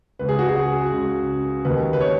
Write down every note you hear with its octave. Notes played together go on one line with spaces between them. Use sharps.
C#2 C#3 B4
G#4
F#4
G#4
C#2 C#3
D#2 D#3 B4
B4
C#5